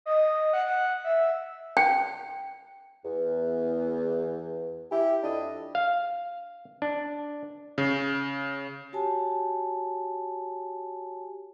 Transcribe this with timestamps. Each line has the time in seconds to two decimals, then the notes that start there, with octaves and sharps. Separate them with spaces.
0.06 D#5
0.53 F#5
0.66 F#5
1.04 E5
1.77 G5
3.04 E2
4.92 E4 G4
5.23 F2 D4 E4 D#5
5.75 F5
6.82 D4
7.78 C#3
8.93 F#4 G4 C#5 G#5 A5